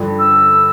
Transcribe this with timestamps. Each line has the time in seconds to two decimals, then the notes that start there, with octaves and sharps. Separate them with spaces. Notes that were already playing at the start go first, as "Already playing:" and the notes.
Already playing: G2 D3 F3
0.19 E6